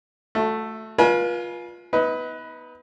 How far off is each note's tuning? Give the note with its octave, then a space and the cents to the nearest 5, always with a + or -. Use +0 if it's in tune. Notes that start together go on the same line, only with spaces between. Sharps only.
A3 +0 F#4 -35
F4 +10 B4 -40 G#5 +25
B3 +0 D#4 +35 B4 +0